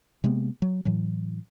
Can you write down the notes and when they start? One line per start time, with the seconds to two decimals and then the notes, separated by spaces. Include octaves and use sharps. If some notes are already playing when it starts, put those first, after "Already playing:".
0.24 C3 G#3 A#3 B3
0.62 F#3
0.85 A2 E3 F#3